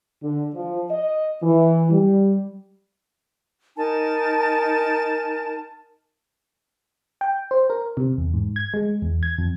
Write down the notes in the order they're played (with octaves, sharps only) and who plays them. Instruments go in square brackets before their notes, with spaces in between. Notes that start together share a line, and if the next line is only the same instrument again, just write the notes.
[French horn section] D3
F3
D#5
E3
G3
[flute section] D#4 A#4 G#5 A5
[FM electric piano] G5
C5
A#4
C3
E2
G#2
G#6
G#3
E2
G#6
F2